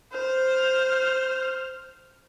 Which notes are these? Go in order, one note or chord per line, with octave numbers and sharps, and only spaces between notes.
C5 F6